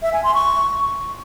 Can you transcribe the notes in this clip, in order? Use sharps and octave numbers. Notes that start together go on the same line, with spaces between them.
E5
G#5
C6
C#6